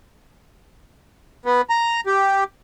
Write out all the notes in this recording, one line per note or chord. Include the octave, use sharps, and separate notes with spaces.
B3
A#5
G4